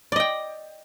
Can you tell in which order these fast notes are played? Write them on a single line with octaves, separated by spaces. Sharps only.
D5 D#5 G5